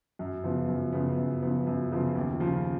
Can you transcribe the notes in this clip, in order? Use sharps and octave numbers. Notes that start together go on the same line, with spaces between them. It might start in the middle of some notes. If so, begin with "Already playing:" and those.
F#2
C#3 F3 B3
F#2
C#3 F3 B3
F#2
C#3 F3 B3
F#2
C#3 F3 B3
D#2
C#3 F3